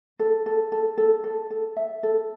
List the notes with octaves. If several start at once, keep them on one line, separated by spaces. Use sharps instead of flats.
A4
A4
A4
A4
A4
A4
E5
A4